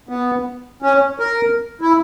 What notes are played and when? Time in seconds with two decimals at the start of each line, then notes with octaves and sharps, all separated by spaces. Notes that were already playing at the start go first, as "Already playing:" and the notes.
0.09 B3
0.82 C#4
1.19 A#4
1.81 E4